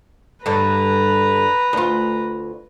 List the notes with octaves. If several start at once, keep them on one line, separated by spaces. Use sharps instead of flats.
G2 D3 B4 A#5
D2 F4